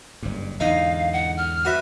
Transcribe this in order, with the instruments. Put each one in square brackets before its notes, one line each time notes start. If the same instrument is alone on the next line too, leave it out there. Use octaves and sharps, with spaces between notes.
[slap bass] F#1 G2
[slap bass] E2 G#2 D3 [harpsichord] D#4 [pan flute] F5
[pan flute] F#5
F6
[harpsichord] F#4 B4 E5